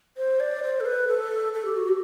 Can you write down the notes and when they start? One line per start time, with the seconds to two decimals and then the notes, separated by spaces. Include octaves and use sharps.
0.17 C5
0.40 D5
0.63 C5
0.80 A4
0.85 B4
1.08 A4
1.54 A4
1.65 G4
1.77 F#4
1.88 G4